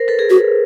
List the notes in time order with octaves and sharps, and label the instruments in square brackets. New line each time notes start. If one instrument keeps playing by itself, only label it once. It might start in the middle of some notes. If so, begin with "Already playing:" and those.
Already playing: [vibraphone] A#4 C5
A4 B4
G#4 A#4
[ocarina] F#4 [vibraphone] A4 B4